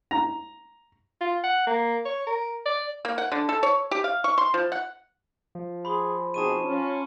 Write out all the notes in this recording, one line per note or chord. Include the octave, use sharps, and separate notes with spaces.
A#5
F4
F#5
A#3
C#5
A#4
D5
A#3
F#5
D3
A4
C#5
G4
F5
C#6
C6
F3
F#5
F3
G#4 B5 C6
B2 C4 D#4 G#4 A5 C#6 D#7
C#4 F4